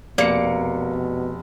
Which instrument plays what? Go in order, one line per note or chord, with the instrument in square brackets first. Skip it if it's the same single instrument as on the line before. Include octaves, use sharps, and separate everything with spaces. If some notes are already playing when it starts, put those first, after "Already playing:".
[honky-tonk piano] F1 C#7 [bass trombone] B2 [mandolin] A#3 [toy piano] D5